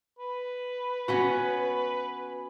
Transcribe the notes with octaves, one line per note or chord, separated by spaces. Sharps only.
B4
B3 C#4 F#4